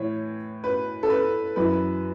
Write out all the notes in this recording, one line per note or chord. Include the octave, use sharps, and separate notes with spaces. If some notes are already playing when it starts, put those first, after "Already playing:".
Already playing: A2 E3 C#5
B4
A4
B4
F#2 E3 B4